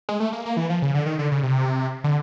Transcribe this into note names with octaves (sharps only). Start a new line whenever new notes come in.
G#3
A3
A#3
A#3
E3
F3
C#3
D3
D#3
D3
C#3
C3
D3